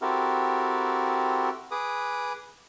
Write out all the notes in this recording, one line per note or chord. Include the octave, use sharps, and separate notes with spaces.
C4 E4 F#4 G4 A4 A#4
G#4 B4 D6 D#6